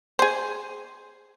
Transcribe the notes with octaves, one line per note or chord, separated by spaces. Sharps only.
G#4 C5